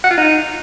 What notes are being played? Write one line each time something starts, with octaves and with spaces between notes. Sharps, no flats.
F#5
F4
D#4